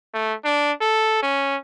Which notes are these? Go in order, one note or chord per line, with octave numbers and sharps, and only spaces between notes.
A3
D4
A4
C#4